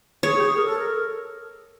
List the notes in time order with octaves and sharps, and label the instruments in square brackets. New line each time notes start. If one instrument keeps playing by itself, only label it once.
[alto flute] G#4 [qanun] C#5
[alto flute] G4
G#4
A#4
A4
A#4